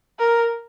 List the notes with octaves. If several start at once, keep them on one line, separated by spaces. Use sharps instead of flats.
A#4